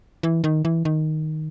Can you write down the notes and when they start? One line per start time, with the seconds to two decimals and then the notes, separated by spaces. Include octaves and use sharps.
0.23 E3
0.44 D#3
0.65 E3
0.85 D#3